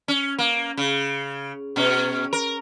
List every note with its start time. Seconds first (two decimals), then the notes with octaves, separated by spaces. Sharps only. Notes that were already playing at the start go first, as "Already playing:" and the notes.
0.08 C#4
0.38 A#3
0.77 C#3
1.76 B2 C#4
2.33 A#4